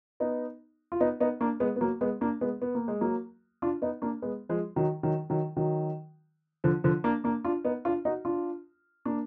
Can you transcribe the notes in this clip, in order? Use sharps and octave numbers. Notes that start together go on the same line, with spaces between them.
B3 D#4
F4
B3 D#4
B3 D#4
A#3 D4
G#3 B3
B3
F#3 A#3
G#3 B3
A#3 D4
G#3 B3
B3
A#3
G#3
F#3 A#3
D4 F4
B3 D#4
A#3 D4
G#3 B3
F3 G#3
D#3 F#3
D#3 F#3
D#3 F#3
D#3 F#3
D3 F3
D3 F3
A#3 D4
A#3 D4
D4 F4
B3 D#4
D4 F4
D#4 F#4
D4 F4
A#3 D4